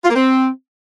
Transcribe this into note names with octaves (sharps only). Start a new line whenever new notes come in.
F4
A#3
C4